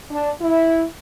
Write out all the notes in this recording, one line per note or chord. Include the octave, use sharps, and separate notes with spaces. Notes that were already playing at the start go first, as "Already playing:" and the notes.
D4
E4